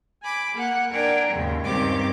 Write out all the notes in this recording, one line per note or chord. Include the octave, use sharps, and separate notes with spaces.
G#5 B5 D6
A#3 F#5
D4 A#4 G5 G#5 A#5
D#2 G#2 C#3 G#3
G2 D#3 C4 C#4 G4 D6